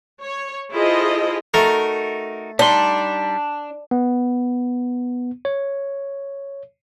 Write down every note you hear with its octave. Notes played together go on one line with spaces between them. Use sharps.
C#5
E4 F4 G#4 A4 C5 D#5
A3 D#4 F#4 A#4
G3 D4 D#4 C6
B3
C#5